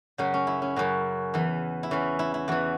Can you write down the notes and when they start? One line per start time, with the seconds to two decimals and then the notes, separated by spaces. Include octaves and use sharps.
0.18 F#2 C#3 F#3 C#4
0.34 C#4
0.47 E4
0.62 C#4
0.76 F#2 C#3 F#3
1.34 E2 E3
1.83 E4
1.91 E2 E3 C#4
2.19 E4
2.34 E4
2.48 E2 E3 F#4